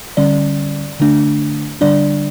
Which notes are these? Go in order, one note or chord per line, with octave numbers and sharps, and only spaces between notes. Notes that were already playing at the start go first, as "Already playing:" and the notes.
D3 G3 C#4 D5
D3 A3 D4
D3 G3 D4 D5